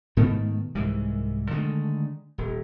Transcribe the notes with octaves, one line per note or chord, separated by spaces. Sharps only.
G#2 B2 D#3 A3
C2 G#2 E3
D3 D#3 G#3 A3
D#1